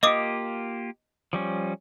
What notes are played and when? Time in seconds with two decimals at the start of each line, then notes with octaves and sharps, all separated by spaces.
0.03 A#3 F4 G4 D#5 D6 D#6
1.33 F3 G3 C#4